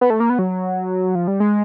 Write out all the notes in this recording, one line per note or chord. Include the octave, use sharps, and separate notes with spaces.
B3
A3
A#3
B3
F#3
F3
G3
G#3